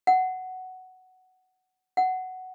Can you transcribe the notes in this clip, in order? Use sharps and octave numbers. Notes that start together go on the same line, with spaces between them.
F#5
F#5